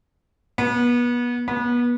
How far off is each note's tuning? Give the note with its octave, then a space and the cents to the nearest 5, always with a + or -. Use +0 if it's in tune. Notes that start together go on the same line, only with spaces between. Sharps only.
B3 -30
B3 -30